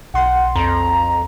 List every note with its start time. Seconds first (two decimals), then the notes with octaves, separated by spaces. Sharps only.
0.14 B1 F#5 C6
0.56 F2 A#5